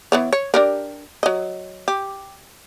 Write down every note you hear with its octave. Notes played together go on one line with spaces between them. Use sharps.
E3 B3 C#5
C#5
D4 G4 A#4
F#3 D#5
G4